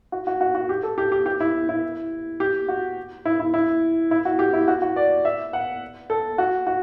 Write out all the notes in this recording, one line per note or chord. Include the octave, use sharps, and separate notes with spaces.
F#4
F#4
F#4
F#4
G4
A4
G4
G4
G4
E4
E4
G4
F#4
E4
E4
E4
E4
F#4
G4
E4
F#4
F#4
D5
E5
F#5
A4
F#4
F#4